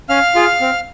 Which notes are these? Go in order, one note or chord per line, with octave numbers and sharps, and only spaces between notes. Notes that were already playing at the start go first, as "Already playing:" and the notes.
C#4 F5 F6
F4 G#4
C4